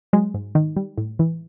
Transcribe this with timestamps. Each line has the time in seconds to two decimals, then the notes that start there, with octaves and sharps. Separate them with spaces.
0.13 F#3 G#3
0.34 G#2
0.55 D#3
0.77 G3
0.98 A2
1.19 E3